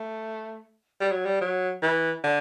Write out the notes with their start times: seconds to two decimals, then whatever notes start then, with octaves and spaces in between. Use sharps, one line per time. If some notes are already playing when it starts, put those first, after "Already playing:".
Already playing: A3
1.00 G3
1.12 F#3
1.25 G3
1.41 F#3
1.82 E3
2.24 D3